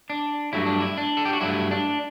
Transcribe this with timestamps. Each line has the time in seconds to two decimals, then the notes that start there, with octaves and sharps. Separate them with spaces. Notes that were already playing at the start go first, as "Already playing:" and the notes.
0.10 D4
0.53 G2 F#3 A3 E4
0.66 D4
0.80 E4
0.98 D4
1.17 A4
1.25 G4
1.33 F#4
1.41 G2 F#3 A3 E4
1.71 D4